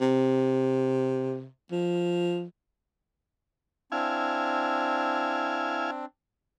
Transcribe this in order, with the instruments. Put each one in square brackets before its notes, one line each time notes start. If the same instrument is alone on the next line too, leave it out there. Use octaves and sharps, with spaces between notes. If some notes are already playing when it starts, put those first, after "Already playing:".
[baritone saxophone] C3
F3
[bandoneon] C4 D4 [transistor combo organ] E4 F5 G#5